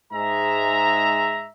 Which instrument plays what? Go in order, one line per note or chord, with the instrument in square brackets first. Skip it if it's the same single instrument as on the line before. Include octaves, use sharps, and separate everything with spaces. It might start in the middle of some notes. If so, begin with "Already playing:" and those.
[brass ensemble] G#2 G#3 E5 A#5